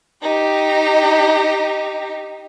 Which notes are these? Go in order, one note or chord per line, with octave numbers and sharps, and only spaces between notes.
D#4 G4